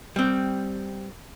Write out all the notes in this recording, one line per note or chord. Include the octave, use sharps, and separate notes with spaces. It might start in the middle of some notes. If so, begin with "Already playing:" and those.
G3 C4